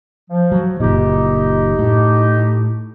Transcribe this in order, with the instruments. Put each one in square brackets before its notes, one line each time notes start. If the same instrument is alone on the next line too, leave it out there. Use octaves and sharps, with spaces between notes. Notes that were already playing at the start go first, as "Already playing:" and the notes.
[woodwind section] F3
[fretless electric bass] F#3
[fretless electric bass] F#1 A#2 [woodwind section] D#4 G4
[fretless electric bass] A2